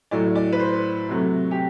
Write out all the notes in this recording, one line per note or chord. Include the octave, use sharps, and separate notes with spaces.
A2 F#3 A3 D5
D5
B4
C5
C3 F#3 A3
G4